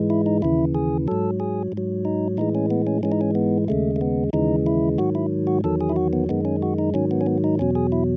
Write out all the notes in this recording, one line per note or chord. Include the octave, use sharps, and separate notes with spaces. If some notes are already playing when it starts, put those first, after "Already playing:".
Already playing: G#2 E3 G#3
E4
D#4
D#2 C#3 E3 E4
G#4
G#2 F#3 A4
G#4
G#2
F#3
D#4
A2 E3 G#3 D#4
C#4
B3
C#4
G#2 E3 G#3 C#4
D#4
C#4
B3
D#2 C#3 G#3 A3
A3
B3
D#2 C#3 E3 G#3 D#4
E4
G#2 D#3 F#3 F#4
E4
F#4
E2 D#3 F#3 A4
G#4
E4
F#4
B3
F#2 D#3 G#3 B3
C#4
F#4
D#4
G#2 D#3 F#3 C#4
B3
C#4
B3
D#4
E2 B2 F#3 C#4
G#4
E4